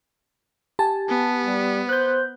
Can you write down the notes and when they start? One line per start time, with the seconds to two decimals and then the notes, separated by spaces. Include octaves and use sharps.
0.79 G4 G#5 A5
1.09 B3
1.45 G3
1.89 C5 F#6 G6